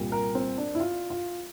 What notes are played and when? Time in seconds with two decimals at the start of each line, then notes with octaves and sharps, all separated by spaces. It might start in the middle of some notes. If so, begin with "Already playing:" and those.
Already playing: C2 A#2 G3
0.12 A#4
0.35 C4
0.57 D4
0.75 E4
0.80 F4
1.10 F4